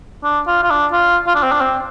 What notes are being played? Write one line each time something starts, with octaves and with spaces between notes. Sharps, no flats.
D4
F4
F4
D4
F4
F4
D4
C4
D4
C4